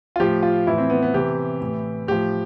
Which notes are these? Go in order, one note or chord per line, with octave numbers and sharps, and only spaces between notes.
F4
A2 F3 G4
F4
A2 E3 E4
C4
B3
B3
C3 E3 G4
A2 E3
A2 F3 G4